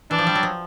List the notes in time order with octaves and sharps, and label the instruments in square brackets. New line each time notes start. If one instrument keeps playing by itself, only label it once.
[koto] E3 [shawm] D4
[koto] F3
G3
F#3
F3